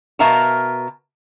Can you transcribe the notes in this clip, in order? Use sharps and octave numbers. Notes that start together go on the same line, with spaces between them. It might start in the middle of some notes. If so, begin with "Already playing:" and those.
B2 A#4 E5 F5 A5 A#5